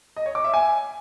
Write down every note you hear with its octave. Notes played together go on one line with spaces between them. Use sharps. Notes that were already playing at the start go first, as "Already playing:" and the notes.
D#5
C#5
D6
E5
G#5